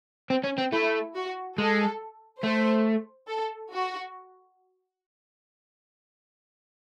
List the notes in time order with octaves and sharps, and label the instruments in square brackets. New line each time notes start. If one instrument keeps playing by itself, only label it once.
[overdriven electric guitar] C4
C#4
C4
[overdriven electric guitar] A3 [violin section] E4
[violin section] F#4
[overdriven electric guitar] G#3 [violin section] A4
[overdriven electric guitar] A3 [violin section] C5
[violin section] A4
F#4